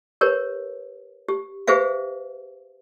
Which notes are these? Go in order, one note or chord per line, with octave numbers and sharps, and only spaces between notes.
G4 A#4 B4 C#5
G4
G4 G#4 B4 C5 E5 F5